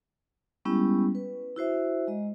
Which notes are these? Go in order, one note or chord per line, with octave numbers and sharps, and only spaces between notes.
G3 G#3 B3 C#4 E4 G4
B4
E4 F#4 C5 E5
G#3 D#5